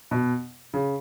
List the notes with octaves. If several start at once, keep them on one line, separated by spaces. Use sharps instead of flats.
B2
C#3